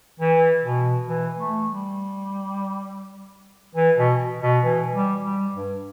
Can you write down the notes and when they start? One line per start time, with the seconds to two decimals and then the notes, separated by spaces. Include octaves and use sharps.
0.20 E3
0.64 B2
1.09 E3
1.39 A3
1.68 G3
3.75 E3
3.98 B2
4.42 B2
4.64 E3
4.93 G3
5.24 G3
5.53 G2